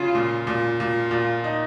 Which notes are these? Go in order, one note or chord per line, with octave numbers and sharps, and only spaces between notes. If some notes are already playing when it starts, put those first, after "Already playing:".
Already playing: C#3 F4
A#2
A#2
A#2 F4
A#2
D#4